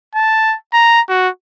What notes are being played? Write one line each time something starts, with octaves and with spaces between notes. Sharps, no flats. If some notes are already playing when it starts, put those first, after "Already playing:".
A5
A#5
F#4